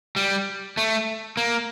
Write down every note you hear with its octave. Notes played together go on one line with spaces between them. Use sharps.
G3
A3
A#3